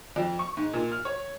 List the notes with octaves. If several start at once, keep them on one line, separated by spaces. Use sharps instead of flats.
F2
C#6
G#2
A#2
F6
C#5